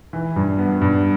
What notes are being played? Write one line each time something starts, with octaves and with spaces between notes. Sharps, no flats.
E3
G2
B3
G2